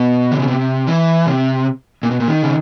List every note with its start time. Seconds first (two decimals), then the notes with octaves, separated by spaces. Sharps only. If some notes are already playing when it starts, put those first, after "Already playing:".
Already playing: B2
0.32 D3
0.40 C#3
0.48 C3
0.87 E3
1.26 C3
2.03 A#2
2.11 B2
2.20 A#2
2.28 D#3
2.43 C#3